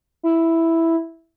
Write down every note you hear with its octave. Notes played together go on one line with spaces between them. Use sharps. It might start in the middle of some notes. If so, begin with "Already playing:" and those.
E4